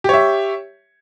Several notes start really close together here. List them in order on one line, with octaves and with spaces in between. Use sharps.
G4 C#5 E5